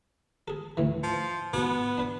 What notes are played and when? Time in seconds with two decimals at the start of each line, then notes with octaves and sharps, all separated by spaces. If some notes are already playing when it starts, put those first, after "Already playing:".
0.48 G#4 A4
0.77 D2 A2 E3
1.03 F3
1.53 G#2 B2 B3
1.98 D4 B4